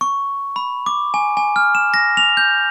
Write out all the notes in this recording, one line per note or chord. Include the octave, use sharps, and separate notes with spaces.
C#6
B5
D6
G#5
G#5
F6
E7
A#6
F7
G6